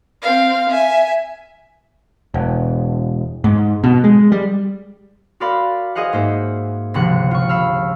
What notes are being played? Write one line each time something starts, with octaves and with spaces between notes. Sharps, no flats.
C4 F5
E5 G#5
E1
G#2
B2
G#3
G3
F#4 A#4 D5 F5 B5 C6
G#4 C5 D#5 F5 F#5
G#2 A#3 C5 E5
G1 C#2 C3 F3 F#5
F4 C#6
F5 B5 E6 F6